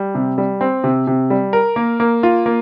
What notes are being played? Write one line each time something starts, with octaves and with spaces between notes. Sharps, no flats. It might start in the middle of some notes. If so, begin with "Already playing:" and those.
Already playing: G3
C3
G3
C4
C3
C3
G3
A#4
A#3
A#3
F4
A#3